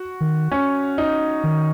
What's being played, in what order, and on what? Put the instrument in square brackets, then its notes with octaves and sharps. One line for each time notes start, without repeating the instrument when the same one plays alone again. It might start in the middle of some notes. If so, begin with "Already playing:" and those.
Already playing: [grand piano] F#4
[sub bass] D#3
[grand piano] C#4
D#4
[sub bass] D#3